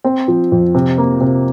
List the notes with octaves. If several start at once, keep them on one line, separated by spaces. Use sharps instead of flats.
C4
F3
F2
C3
A#3
C3